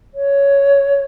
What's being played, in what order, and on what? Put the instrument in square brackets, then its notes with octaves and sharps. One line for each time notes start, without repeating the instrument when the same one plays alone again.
[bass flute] C#5